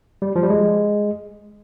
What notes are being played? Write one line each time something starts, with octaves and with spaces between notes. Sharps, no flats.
G3
F3
G3
G#3